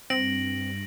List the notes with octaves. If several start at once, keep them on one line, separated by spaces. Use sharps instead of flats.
G2 C4 A#6 D7 F#7